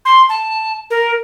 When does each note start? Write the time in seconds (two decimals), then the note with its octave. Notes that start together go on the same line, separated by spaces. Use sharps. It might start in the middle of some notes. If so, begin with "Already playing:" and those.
0.05 C6
0.29 A5
0.90 A#4